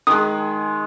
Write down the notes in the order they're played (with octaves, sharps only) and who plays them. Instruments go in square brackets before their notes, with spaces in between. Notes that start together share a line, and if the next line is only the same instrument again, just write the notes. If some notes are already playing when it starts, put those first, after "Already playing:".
[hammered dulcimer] D#3 G#3 [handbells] D#6